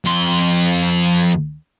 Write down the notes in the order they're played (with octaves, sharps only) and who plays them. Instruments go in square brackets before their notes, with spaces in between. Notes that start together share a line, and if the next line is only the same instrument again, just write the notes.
[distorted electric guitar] F2 C6